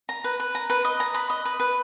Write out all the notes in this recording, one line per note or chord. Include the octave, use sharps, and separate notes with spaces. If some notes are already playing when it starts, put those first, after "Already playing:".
A#5
B4
B4
A#5
B4
D#5
A#5
B4
D#5
B4
B4